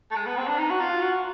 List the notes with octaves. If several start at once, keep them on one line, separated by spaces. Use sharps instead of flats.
A3
G#3
B3
C4
D4
D#4
F#4
F4
F#4